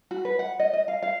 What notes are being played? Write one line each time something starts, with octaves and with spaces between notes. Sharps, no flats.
F#4
B4
F#5
D#5
D#5
F5
F5